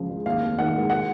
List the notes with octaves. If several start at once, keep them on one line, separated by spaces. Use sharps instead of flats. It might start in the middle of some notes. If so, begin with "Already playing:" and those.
Already playing: C#2 C#3 F3
G#3
D#2 F5
F1
D#3 F#5
G#3
F#5